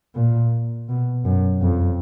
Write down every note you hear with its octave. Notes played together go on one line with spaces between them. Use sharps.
A#2
B2
F#2
F2